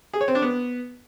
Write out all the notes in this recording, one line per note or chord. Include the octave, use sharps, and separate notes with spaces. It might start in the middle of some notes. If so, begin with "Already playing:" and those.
G#4
C#5
C4
D4
B3